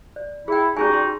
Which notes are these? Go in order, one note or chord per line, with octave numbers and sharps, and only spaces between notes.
D5
E4 G#4 G5
G3 C#4 D#4 F#4 G#4 G#5
C6